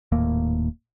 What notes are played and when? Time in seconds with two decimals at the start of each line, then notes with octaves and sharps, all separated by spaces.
0.12 D#1 D#2 A2 A#3